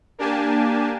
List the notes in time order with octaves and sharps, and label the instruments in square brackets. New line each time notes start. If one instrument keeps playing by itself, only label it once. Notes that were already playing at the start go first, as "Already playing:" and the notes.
[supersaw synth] A#3 D4 G4 G#5 A5